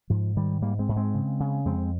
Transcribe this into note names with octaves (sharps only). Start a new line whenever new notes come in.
G#2 F3
G#2 D#3 G3
G#2 G3 A#3
G#3 C4
G#2
G#3 C4
C#3
C#3
F2 G#3 C4